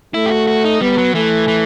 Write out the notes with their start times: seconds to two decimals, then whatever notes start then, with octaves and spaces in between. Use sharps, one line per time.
0.14 A3 E4
0.26 G4
0.31 F#4
0.47 F#4
0.64 D#4
0.81 G3 B3
0.98 F#3
1.15 E3 A3
1.48 E3